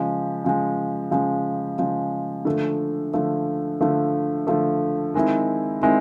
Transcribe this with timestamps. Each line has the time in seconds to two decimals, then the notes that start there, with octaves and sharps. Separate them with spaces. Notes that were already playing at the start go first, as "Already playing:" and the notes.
Already playing: C#3 F3 G#3
0.44 C#3 F3 G#3
1.11 C#3 F3 G#3
1.79 C#3 F3 G#3
2.45 D3 F3 A3
3.14 D3 F3 A3
3.81 D3 F3 A3
4.47 D3 F3 A3
5.14 D#3 G#3 C4 E4
5.81 D#3 G#3 C4 E4